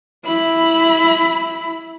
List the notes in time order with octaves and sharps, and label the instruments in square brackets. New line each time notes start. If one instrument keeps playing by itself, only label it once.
[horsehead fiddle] E4 B5